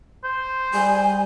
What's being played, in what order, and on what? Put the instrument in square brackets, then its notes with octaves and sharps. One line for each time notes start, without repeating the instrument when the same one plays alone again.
[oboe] C5
[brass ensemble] G3 [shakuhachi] G#5